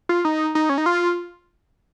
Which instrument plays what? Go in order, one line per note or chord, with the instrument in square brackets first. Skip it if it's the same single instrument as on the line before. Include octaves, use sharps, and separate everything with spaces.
[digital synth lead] F4
D#4
D#4
C#4
D#4
F4